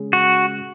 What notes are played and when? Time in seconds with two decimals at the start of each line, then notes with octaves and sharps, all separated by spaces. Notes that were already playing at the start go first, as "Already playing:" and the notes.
Already playing: C#3 G#3 C#4 G#4
0.13 F#4